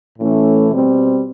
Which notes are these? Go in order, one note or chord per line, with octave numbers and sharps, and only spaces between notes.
A2 E3 A3 C#4
B2 G3 C4